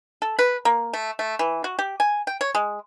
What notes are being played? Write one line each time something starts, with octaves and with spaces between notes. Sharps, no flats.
A4
B4
A#3
A3
A3
E3
F#4
G4
G#5
G5
C#5
G#3